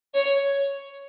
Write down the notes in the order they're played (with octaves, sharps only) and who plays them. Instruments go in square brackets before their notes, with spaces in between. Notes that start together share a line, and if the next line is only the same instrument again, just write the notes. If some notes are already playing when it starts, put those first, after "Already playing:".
[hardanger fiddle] C#5